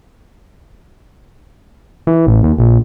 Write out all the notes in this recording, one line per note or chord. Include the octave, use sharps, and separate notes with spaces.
E3
A1
D#2
A#1